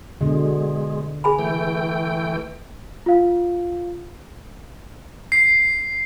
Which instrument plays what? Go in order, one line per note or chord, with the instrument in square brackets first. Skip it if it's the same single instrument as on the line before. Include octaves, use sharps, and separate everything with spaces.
[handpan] B2 D3 [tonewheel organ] G#3
[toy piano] G#4 G#5 B5
[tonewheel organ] E3 A3 G5
[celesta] F4 F5
[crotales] C7